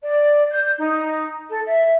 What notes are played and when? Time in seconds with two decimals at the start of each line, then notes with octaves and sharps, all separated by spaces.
0.03 D5
0.50 G6
0.78 D#4
1.49 A4
1.66 E5